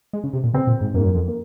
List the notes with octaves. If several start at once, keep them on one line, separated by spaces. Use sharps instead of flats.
G#3
C#3
C3
A#2
C#3 C4
A#2
G#2
F#2 A#3
G#2
F#2
F2
A#3